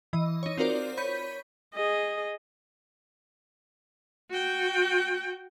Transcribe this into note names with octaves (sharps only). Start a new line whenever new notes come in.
E3 D#5
D#4 C#5
C4 F4 F#4 A#4 C5 D5
C#5 B5 G6 B6 D#7
G#4 D#5
F#4 G5